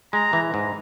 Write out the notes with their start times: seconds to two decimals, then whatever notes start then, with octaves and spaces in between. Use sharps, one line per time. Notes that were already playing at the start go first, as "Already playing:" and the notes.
0.13 G#3 A#5
0.33 E3
0.54 G#2